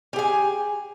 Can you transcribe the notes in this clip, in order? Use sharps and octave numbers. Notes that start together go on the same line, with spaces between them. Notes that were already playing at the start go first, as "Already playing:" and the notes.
G4 G#4 G#5